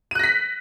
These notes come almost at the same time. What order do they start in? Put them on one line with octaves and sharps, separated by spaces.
D#7 F#6 A#6 B6